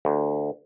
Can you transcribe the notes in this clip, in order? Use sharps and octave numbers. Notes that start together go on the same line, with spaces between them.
D2